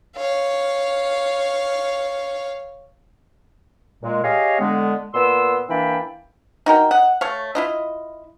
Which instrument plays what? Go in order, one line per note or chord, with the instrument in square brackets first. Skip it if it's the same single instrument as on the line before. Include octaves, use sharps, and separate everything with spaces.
[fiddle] C#5 F5
[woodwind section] A#2 G#3
G4 G#4 C#5 D#5 F5
D3 G#3 B3
A#2 B3 C6 E6
E3 A#3 D4 E5 G5 B5
[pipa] D#4 F#4 A#4 G5
D#5 F#5
A3 C#5 F5
E4 F4 D#5